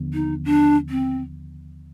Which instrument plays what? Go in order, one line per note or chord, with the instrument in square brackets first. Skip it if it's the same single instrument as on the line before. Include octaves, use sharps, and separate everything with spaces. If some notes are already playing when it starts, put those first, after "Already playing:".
Already playing: [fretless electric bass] D#2 D3 F3 B3
[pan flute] D#4
D4
C4